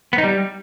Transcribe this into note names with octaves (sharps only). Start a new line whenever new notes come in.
B3
D#4
G3